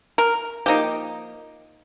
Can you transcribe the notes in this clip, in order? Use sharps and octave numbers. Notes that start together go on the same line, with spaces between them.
A#4
F3 A#3 D#4 G4